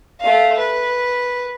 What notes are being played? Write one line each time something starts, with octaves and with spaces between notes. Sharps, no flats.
A3 F5
B4